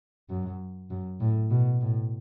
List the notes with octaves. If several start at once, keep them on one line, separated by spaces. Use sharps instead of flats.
F#2
F#2
A2
B2
A2